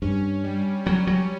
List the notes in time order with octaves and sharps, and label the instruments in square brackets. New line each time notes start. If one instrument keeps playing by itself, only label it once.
[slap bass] G2 [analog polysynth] C#4
[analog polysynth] G3
[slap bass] F#3 [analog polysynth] C#4
[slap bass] F#3